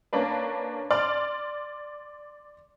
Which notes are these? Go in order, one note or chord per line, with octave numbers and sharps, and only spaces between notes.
A#3 C#4 D4 B4
D5 C6 F6